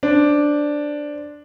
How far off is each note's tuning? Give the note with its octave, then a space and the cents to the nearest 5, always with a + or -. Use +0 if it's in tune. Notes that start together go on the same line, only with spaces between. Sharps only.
D4 +0 C5 +0